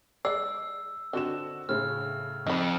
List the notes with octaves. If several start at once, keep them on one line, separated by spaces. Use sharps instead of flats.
G#3 D5 E6 C7
D3 D#3 C4 D4 F#4 E7
A2 C#3 F6
F2 D#4 B5